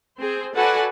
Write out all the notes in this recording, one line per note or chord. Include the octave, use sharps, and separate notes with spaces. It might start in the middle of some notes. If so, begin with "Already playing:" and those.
C4 G#4 C5
F#4 A4 B4 D5 F#5 G#5